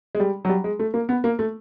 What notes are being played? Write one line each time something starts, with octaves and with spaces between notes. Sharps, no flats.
G#3
G3
F#3
G3
G#3
A3
A#3
B3
A#3
A3